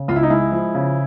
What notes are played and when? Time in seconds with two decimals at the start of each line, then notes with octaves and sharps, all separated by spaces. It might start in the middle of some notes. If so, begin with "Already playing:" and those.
Already playing: C#3
0.08 C#2 F4
0.16 E4
0.23 D#4
0.30 G#3 E4
0.52 F3
0.75 C#3